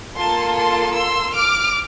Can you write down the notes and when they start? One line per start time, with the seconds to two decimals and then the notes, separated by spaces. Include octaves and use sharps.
0.18 A#3 F4 A4 A5 C6
0.57 A5 C6
0.96 C6 E6
1.35 D6 F6